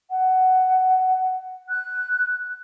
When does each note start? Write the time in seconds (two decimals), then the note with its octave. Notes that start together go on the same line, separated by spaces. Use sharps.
0.10 F#5
1.69 F#6